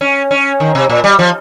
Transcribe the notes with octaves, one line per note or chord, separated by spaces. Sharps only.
C#4
C#4
D#3
C3
A#2
G3
F3